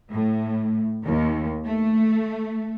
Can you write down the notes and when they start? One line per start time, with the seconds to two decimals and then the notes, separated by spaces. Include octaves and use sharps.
0.11 A2
1.04 D#2
1.65 A3